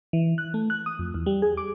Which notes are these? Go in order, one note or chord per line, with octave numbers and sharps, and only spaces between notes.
E3
F#6
A3
F#6
D#6
F2
E2
G3
G#4
D6